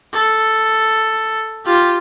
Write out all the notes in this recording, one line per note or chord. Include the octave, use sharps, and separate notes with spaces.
A4
F4 G4